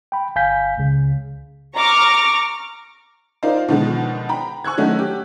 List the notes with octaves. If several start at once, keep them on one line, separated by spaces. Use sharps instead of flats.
G5 B5
G1 F5 G#5 G6 B6
C#2 C#3
A#5 C#6 D6 F6
D#4 F4 A#4 C5 D5 F5
B2 D3 D#3 F3 G#3
G5 A#5 B5
G#5 C#6 E6 F#6 G#6
D#3 F#3 A3 C#4 D#4
G4